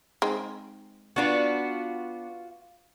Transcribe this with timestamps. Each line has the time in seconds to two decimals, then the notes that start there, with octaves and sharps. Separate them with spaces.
0.22 G#3 C4 D#4
1.16 B3 D4 F4 F#4 B4